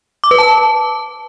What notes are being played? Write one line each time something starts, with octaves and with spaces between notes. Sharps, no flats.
D6
B4
A5